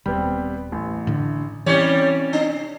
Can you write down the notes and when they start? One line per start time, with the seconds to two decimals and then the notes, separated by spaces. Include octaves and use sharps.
0.06 D#1 G3 B3 C4
0.72 A1
1.07 A2 D3
1.66 C3 E3 G3 C#4 C#5
2.33 D4